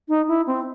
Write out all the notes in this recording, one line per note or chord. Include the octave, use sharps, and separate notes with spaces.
D#4
E4
C4